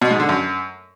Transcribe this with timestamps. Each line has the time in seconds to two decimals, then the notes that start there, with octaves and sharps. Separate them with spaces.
0.01 B2
0.11 G#2
0.20 D3
0.29 F#2